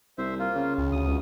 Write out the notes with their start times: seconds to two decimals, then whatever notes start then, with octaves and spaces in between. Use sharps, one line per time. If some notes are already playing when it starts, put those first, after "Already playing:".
0.18 C2 C5 E5
0.39 A#3 F4
0.56 C#3
0.78 C#2
0.92 D2 D#6
1.08 C#2